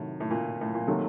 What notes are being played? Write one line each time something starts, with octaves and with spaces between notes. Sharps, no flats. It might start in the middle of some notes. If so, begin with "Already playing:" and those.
Already playing: A2 C3 D#3 F#3
A2
A#2
A2
A#2
C3 D#3 F#3 A#3 F#4 A4